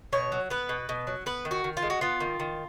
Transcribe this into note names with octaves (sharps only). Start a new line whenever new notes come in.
B2 C#5
F#3
B3 B4
B2
B2
F#3
B3 B4
D#3
F#4
D#3
F4
G#3
F#4
B3 F4
D#3
D#3